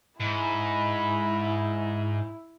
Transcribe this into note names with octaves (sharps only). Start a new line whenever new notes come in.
G#2 E4 B5